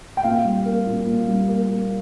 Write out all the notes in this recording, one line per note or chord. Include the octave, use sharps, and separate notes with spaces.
G5
A#2 F5
G3
A#3
A#2
A#2
G3
A#3
A#2